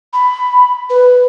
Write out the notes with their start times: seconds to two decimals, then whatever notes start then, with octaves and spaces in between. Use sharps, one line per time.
0.13 B5
0.90 B4